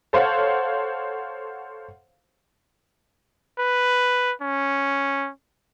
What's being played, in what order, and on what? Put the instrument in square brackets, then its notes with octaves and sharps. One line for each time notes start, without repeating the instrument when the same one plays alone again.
[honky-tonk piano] A4 C5 C#5 F5 F#5
[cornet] B4
C#4